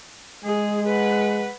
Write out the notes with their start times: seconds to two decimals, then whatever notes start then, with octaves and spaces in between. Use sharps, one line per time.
0.44 G#3 G#4
0.88 B4 F#5